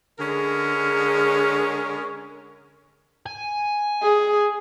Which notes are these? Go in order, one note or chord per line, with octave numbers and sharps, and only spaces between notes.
D3 G#3 C#4 G#4 A#4
G#5
G#4